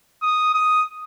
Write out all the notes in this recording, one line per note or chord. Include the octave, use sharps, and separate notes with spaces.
D#6
D#6